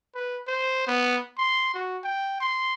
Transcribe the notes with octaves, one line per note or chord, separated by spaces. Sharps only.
B4
C5
B3
C6
F#4
G5
C6